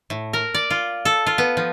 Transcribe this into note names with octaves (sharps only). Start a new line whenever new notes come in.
A2
A#4
D5
F4
A4
F4
B3
F3